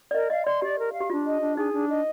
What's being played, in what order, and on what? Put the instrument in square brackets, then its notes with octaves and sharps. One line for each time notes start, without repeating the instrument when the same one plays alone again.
[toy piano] D5
[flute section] A#4 [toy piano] D#5
[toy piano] D#5 [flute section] F5
[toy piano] D5 [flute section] C6
[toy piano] G4 [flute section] D5
[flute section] A#4
F5
[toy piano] G4
[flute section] D4 [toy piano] F4
[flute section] D#5
D4
[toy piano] D#4 [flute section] G#4
[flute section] D4
D#5